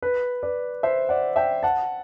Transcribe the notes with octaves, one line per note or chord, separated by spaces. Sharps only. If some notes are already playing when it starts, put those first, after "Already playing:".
B4
B4 D5
C5 E5
D5 F#5
E5 G5
F#5 A5